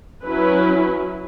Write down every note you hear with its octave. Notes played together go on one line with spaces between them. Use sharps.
F#3 C#4 E4 B4